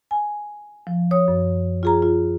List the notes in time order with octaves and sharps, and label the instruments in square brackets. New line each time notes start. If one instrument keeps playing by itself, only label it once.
[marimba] G#5
F3
C#5 D#6
F#2
F4 G#4 A#5
F4